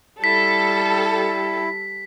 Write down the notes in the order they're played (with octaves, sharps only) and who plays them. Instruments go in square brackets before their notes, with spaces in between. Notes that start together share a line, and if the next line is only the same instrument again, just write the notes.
[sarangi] G3 [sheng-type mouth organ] E4 [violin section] A4 [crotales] B6